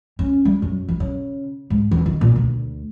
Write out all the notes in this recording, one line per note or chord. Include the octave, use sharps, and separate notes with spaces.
C#4
G3
F#2
E3
C#3
G#2
E2
D#3
A#2
D2